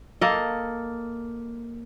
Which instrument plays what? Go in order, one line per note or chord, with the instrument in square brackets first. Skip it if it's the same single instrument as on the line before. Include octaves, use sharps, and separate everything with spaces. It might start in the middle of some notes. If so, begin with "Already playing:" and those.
[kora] A#3 A4 D#5